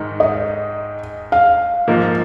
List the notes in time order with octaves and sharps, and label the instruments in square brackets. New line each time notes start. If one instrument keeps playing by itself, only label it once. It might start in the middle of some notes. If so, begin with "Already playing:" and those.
Already playing: [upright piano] G#2 D#3 G#3
[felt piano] D#5
F5
[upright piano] G#2 F3 A#3